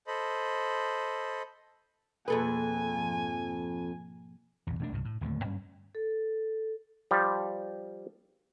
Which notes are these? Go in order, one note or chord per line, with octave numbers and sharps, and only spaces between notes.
A4 C5 D#5 B5
F2 B2 A#3 G#4 A4 B4 G#5
G#2 F3
A#1 E2
E1 A3 C#4 D4
C2 G2 A#2
A2
D1 D#2 D3 A3
G2 G3 C#4
A4
F3 G3